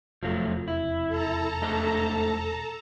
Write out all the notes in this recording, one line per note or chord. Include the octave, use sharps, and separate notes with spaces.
E1 F2 C3 F3 F#3 A3
E4
A4 A5 A#5
G#2 A3 D#5